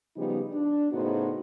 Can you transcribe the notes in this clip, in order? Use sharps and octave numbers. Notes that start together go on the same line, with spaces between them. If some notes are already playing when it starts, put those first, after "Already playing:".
C#3 F3 G3 B3 D#4 G4
D4
A2 C#3 B3 D#4 F#4 C5